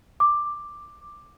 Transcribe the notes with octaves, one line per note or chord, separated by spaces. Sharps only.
D6